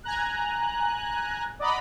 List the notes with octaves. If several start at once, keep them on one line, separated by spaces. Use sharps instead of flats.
G#5 A#5 F#6
D5 D#5 F#5 A#5 B5